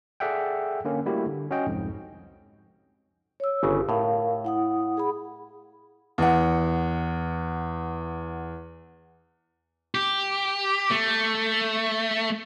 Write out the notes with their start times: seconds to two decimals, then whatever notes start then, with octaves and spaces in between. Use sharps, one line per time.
0.20 G#4 A4 D5 E5 F#5 G5
0.85 D3 A#3 C#4
1.06 G3 A3 A#3 E4 F#4 G4
1.26 D3
1.51 C#4 F#4 D#5 G5
1.67 C2 F2 G#2
3.40 C#5 E6
3.63 G1 C#3
3.89 A2 A#4 F5
4.44 E4 F#5 D#6
4.97 G#4 F#5 B5
6.18 E2 F#5
9.95 G4
10.90 A3